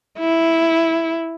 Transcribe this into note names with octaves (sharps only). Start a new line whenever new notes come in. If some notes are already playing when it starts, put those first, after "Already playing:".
E4